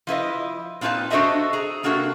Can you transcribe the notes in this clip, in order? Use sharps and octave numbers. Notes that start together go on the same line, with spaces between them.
F3 E4 B4 D#5
A#2 C4 D#4 E4 B4 A5
D4 F#4 A4 C5 D#5 E5
G#4 A#5
C3 A#3 D4 F#4 A4